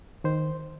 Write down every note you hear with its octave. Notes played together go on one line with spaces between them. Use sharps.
D#3 C5